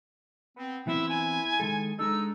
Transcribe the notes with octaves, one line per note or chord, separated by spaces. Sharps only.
B3 C4
E3 B3 C4 E4 E5
E4 G#5
D#3 G#3 A4
G#3 D4 D#4 A4 E6